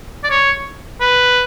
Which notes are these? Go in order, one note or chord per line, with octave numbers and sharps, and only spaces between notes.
D5
C#5
B4